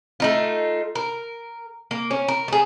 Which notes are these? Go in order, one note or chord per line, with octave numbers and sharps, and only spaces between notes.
A3 D#4 F4
A#4
A#3
C#4
A#4
A3 G#4